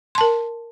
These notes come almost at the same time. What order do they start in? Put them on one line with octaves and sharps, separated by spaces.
C6 A5 A#4